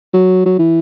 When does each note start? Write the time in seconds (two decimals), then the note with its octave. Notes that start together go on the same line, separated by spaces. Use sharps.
0.14 F#3
0.46 F#3
0.59 E3